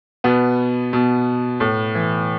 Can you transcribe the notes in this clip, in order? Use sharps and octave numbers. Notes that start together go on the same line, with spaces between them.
B2 B3
B2
A2
E3